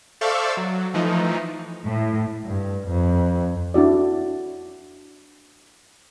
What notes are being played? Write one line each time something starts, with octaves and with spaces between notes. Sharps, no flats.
A4 C5 D5 E5 F5 C#6
F#3
E3 F3 A3 D#4
A2
G2
F2
D4 E4 F#4 D5